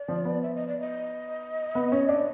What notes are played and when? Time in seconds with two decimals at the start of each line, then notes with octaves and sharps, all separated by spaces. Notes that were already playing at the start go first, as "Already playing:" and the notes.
Already playing: D5
0.08 F3
0.25 B3
0.42 E5
0.55 D#5
0.67 D5
0.80 D#5
1.75 B3
1.92 C#4
2.09 D4